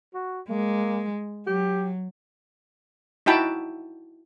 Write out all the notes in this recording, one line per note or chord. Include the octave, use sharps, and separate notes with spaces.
F#4
G#3 A#3
F#3 G4
D#4 E4 F#4 G5 A5 B5